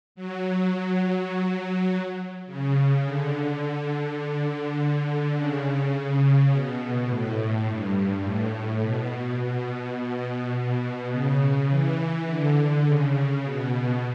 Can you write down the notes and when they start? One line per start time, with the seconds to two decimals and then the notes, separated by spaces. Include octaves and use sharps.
0.15 F#3
2.46 C#3
3.04 D3
5.35 C#3
6.51 B2
7.08 A2
7.67 G2
8.23 A2
8.82 B2
9.39 B2
9.97 B2
10.55 B2
11.12 C#3
11.70 E3
12.27 D3
12.86 C#3
13.43 B2